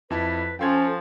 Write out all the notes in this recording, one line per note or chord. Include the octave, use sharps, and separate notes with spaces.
F2 E4 B4 A5
F3 C#4 A4 G5 C6 G#6